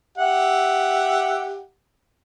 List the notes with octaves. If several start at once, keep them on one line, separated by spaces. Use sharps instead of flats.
G4 E5 F#5